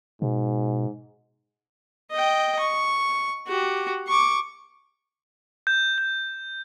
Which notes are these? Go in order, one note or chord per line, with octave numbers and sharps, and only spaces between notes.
G#2 B2
D#5 G5
C#6
F#4 G4
C#6 D6
G6
G6